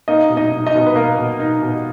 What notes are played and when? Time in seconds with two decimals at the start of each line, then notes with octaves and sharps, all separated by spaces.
0.08 A#3 D#4 D#5
0.29 B2
0.37 D#4 D#5
0.52 D#4
0.67 D#4 D#5
0.75 B2
0.87 B4
0.95 A#3 A#4
1.18 B2
1.40 D#4
1.62 B2